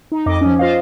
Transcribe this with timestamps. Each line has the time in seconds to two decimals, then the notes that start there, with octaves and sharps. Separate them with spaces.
0.12 D#4
0.26 F2 D#5 D6
0.41 F3 C#4
0.59 F4 C5 D#5 F5